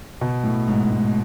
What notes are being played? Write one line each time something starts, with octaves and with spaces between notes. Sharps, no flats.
B2
A2
G#2
G#2